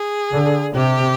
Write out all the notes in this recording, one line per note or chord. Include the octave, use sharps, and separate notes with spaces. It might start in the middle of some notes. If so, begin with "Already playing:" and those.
Already playing: G#4
D3
C3 G4